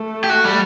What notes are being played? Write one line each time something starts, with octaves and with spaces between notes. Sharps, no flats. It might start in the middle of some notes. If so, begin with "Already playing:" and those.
Already playing: A3
G4
F#4
G3